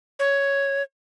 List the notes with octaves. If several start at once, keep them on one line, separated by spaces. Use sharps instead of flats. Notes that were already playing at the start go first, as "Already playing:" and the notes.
C#5